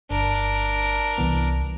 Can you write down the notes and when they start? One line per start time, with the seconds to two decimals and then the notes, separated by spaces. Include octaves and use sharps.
0.11 G1 D4 A#4
1.18 C2 E3 B3